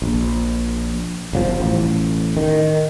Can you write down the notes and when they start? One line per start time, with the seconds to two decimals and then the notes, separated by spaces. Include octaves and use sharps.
0.02 A#1
1.33 G1 C#3 F3
1.60 A1
2.37 D#3